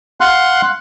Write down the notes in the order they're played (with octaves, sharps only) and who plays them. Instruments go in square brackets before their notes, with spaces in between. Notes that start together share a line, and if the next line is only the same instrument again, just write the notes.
[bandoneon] F5 F#5 C6 F#6